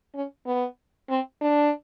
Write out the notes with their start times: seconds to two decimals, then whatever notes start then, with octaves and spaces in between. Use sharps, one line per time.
0.15 C#4
0.46 B3
1.09 C4
1.41 D4